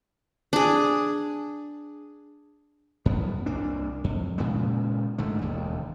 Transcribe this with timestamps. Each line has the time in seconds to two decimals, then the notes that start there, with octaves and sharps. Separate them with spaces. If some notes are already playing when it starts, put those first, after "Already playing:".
0.53 D4 G#4
3.06 F#2 B3
3.46 C2 A#3 D4
4.04 F2
4.38 A#2 C#3 G#3 B3
5.18 G#2 D3 A3
5.41 E1 D#2